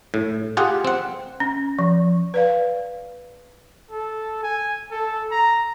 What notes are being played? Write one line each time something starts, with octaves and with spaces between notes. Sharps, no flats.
A2
F4 G4 G#4 F#5
C4 F#5
C#4
F3
B4 D5 F5
A4
G#5
A4
A#5